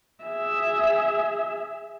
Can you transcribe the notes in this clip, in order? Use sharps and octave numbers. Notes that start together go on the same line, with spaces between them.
G#4 E5